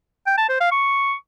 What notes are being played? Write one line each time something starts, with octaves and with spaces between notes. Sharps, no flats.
G5
A5
C5
F5
C#6